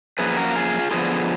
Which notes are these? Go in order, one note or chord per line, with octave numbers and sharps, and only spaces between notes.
F#2 F3 A#3 G#4 B4
F#4 A#4
F4 G#4
D3 F3 B3 F4 G#4